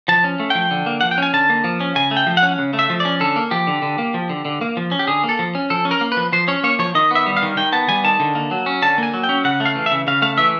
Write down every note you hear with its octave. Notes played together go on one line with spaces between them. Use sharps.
F3 A5
C#4
A3
F3 G5
D3
A#3
F3 F#5
G5
C#4 G#5
D3 A5
A#3
F3
C#4
C#3 G#5
A3
G5
F3
F#5
C#4
C#3
A3
E5
F3
C#4 D5
D3 A4
A#3
F3 G4
D3
D3
A#3
F3
D3
D3
A#3
F3
C#4
G4
D3 G#4
A#3
A4
F3
C#4
F3 A4
C#4
A#4
A#3
B4
F3
F3 C5
C#4 C#5
A#3 C#5
F3 C#5
D#3 D#5
B3 E5
G3
F5
D#3
D#3 G5
B3 A5
G3 G#5
D#3 A5
D3
A#3
F#3
C#4
D3 A5
A#3 G#5
F#3
G5
C#4
C#3 F#5
A3
F5
E3
E5
C#3
C#3 F5
A3 F5
E3 E5